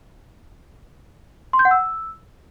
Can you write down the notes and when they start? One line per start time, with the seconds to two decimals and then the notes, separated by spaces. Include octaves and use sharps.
1.53 C6
1.59 G6
1.65 F#5
1.71 E6